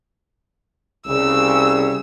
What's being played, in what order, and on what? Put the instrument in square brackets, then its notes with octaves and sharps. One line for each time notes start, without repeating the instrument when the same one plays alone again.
[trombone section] C2 C#3 [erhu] E6